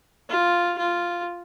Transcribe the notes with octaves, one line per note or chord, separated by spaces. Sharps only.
F4
F4